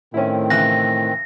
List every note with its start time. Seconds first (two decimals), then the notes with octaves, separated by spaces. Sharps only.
0.14 A2 D#3 C4 C#4 E4
0.50 C#3 E3 F#6 A#6